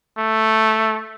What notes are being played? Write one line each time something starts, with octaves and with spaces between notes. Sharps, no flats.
A3